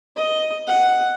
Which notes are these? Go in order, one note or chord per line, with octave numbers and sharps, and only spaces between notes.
D#5
F#5